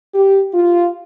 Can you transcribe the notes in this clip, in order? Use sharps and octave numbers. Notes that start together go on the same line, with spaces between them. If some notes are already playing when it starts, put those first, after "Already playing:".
G4
F4